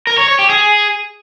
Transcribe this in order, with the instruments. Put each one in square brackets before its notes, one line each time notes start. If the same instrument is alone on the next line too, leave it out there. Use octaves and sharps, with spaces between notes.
[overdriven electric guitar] A#4
C#5
C#5
G4
G#4